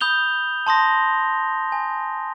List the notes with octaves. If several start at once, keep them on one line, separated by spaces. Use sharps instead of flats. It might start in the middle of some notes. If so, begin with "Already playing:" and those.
B5 D#6 G6 F7 G7
A5 C6 D#6 A#6
G#5